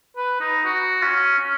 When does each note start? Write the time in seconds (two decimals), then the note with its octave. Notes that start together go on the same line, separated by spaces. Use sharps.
0.16 B4
0.40 D#4
0.65 F#4
1.02 C#4
1.38 C#4